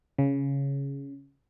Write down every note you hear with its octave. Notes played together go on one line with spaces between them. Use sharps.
C#3